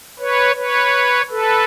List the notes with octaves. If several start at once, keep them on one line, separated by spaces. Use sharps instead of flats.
B4 C#5
B4 C#5
A4 B4